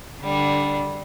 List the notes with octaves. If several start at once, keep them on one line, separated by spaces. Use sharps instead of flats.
D3 G3 D4